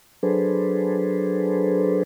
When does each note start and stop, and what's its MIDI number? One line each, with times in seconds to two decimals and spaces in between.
0.23 2.03 54
0.23 2.03 62
0.23 2.03 68
0.23 2.03 69
0.23 2.03 71
0.23 2.03 72